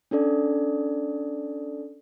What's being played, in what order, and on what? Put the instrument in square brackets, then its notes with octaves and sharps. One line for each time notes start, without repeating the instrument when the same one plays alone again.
[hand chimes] C#4 D4 A4 D5